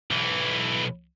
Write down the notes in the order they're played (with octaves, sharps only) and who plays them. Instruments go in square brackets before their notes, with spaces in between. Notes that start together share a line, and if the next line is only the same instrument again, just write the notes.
[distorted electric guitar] B1 E3